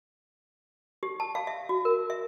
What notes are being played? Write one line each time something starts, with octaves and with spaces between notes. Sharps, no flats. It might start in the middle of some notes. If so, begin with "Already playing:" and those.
G4
A5
F5
E5
F#4
A#4
E5